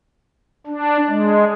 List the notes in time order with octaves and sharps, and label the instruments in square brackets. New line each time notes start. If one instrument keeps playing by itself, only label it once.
[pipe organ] D4
G#3